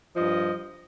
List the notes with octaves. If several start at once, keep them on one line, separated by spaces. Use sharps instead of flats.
G2 F3 D#5